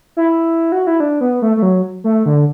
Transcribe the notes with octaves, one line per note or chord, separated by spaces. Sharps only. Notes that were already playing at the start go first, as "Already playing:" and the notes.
E4
F#4
E4
D4
B3
A3
A3
F#3
A3
D3